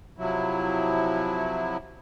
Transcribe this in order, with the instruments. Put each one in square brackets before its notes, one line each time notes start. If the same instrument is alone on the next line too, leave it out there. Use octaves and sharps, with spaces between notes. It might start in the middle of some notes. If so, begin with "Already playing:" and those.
[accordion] C3 F3 F#3 E4